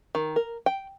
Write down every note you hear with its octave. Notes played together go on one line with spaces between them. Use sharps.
D#3
A#4
G5